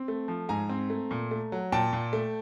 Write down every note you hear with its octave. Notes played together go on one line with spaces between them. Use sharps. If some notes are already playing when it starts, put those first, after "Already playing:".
Already playing: C4
A3
F3
G#2 G#5 A#5
C4
A3
A#2
A3
F#3
A#2 G5 A5
A#2
A3